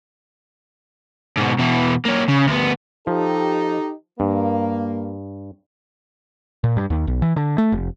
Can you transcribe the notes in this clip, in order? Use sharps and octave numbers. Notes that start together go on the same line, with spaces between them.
G#2 B2
B2 E3
A#3 C#4
C#3
D2 B3
F3 D#4 G4 A4
G2 A#3
A#2
G2
D#2
B1
E3
D3
A3
F1